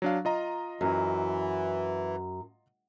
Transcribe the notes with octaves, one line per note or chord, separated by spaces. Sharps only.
F#3 D4 F5
F4 D#5 A#5
F#2 E3